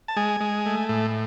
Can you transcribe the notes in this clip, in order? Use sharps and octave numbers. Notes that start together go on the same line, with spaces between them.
A5
G#3 G#5
G#3
A3
A2